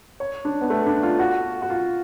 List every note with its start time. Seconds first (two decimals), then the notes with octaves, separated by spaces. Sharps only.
0.20 C#5
0.45 D4
0.61 B3
0.70 A3
0.86 D4
1.03 F4
1.19 F#4
1.62 F#4
1.70 F4